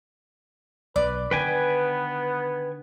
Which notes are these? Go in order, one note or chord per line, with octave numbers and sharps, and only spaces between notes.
B1 B4 D5
D3 D#3 B3 B4 G5 G#5